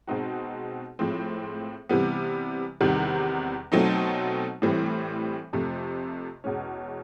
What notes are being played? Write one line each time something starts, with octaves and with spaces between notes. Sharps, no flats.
B2 G#3 C4 D#4 F#4
A2 F3 G#3 C4
C3 E3 G3 B3
E2 C3 D#3 G3
B2 F#3 A3 C4 D#4
A2 E3 G3 C4
F2 C3 F3 A3
E2 B2 G#3 C#4